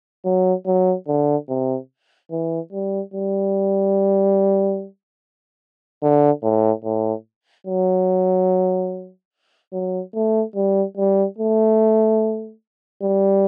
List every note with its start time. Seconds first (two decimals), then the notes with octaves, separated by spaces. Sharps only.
0.25 F#3
0.66 F#3
1.08 D3
1.49 C3
2.31 E3
2.72 G3
3.14 G3
6.02 D3
6.43 A2
6.84 A2
7.67 F#3
9.73 F#3
10.14 A3
10.56 G3
10.97 G3
11.38 A3
13.03 G3